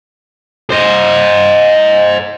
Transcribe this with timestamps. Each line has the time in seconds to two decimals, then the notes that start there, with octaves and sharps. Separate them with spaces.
0.70 C5 D#5